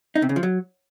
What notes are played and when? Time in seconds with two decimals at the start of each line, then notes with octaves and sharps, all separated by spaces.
0.15 D#4
0.22 C3
0.29 C#3
0.36 F3
0.43 F#3